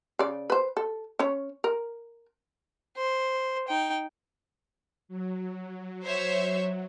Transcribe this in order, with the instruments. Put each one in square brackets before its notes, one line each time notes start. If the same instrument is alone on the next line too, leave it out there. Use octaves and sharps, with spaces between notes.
[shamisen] C#3 D5
B4 C5
A4
C#4 C#5
A#4
[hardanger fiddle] C5
D#4 G5
[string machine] F#3
[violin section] C5 C#5 E5